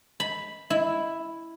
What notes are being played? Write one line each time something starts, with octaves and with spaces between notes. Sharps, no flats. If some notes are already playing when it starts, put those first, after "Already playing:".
B5
E4